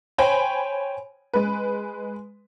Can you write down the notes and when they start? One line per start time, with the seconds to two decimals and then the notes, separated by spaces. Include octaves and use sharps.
0.18 C5 C#5 G5 G#5 B5
1.34 G#3 B4